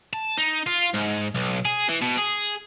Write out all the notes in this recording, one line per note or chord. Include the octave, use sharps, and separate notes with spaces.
A5
D#4
F4
G#2
B1
G#4
E3
B2
G#4